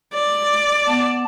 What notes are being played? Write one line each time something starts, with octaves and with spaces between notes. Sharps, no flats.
D5
B3 A5